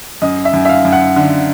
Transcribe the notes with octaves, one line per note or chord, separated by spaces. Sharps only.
F#2 D#5
E5
F#2
E5
F5
F#2
F#5
D3